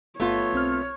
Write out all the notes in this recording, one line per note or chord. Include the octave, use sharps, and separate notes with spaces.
G1 A3 B3 F4 C#5
B1 C4 F6